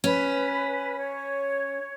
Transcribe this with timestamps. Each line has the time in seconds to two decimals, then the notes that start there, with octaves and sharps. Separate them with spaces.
0.04 C#4 B4
0.98 C#5